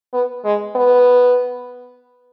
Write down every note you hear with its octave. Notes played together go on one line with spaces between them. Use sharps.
B3
G#3
B3